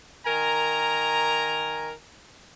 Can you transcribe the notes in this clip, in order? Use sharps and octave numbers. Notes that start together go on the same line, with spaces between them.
D#3 A#4 G#5 A#5